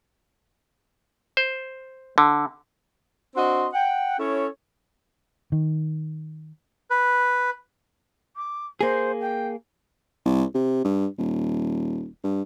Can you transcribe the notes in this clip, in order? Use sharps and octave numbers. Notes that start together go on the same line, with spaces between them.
C5
D3
C4 D4 F#4 D#5 C6
F#5 G5
C#4 E4 A4 C#5
D#3
B4
D6
A#3 G#4 C5
G5
C2
C3
G2
D#1
G2